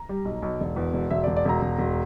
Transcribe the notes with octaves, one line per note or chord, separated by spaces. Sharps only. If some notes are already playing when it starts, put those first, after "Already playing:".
Already playing: A#5
G3
B1
B1
E1
E2
E1
E1 E5
E1 D5
D5
E1 A#5
E1
E1